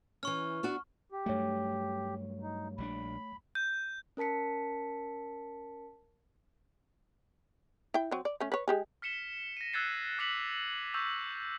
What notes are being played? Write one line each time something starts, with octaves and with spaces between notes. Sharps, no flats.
E3 C#4 C#6 F6
B3 D4 F#4
G4
G2 F#3 A3 C#5
D#4
A#1 G3 D4 B5
G6
C#4 A#4 A5 B6 C#7
E4 G5
F#3 C4
D5
A3 C#4
B4 C#5
G#3 G4 G#4
F6 B6 C#7 E7 G7
A#6 D#7
E6 F#6 G#6 A6 C7 C#7
D6 F#6 B6 C#7 F7 F#7
C#6 E6 G6 B6 F7